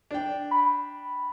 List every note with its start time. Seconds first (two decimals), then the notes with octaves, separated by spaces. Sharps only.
0.11 D4 G5
0.51 B5